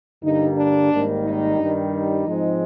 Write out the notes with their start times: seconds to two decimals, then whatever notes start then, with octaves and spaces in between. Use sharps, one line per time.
0.23 G2 D3 G3 A#3 D#4
0.57 D4
0.92 G#1 G#2 D#3 G3 A#3
1.25 D#4
1.58 G2 D#3 G3
1.92 D#4
2.27 G#2 F3 G#3 C4